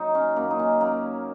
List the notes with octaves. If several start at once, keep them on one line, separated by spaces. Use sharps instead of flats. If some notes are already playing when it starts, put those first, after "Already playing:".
Already playing: F#3 D#4
C#4
F#2 A#3
D#4
C#4
F#3 A#3